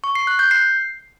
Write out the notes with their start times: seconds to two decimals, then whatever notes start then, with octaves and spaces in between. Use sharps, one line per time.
0.04 C#6
0.15 C7
0.27 F#6
0.39 G6
0.51 C7